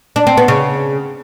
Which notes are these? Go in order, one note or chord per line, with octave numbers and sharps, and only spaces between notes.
D4
C4
B3
C#3